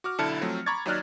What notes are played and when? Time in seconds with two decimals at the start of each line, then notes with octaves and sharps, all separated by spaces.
0.04 F#4 D6 F6
0.18 B1 D3 E4 A5 F6 C#7
0.41 F3 F#3 A3 C4
0.66 A#5 B5 C#6 D6 G#6 A6
0.86 D#2 F#3 D#4 D5 F6 F#6